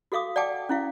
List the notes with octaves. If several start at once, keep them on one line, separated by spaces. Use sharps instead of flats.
F#4 A4 F5 D6 D#6
D5 F#5 G5 A5 D6
C#4 E4 F5